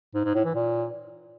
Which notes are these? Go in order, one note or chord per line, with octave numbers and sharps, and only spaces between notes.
G#2
G#2
A2
E3
A#2